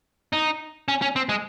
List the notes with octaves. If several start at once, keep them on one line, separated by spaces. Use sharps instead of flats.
D#4
C#4
C#4
C4
G#3